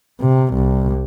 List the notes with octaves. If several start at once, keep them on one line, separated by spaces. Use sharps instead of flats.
C3
C2